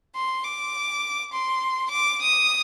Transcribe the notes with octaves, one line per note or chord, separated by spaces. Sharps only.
C6
D6
C6
D6
D#6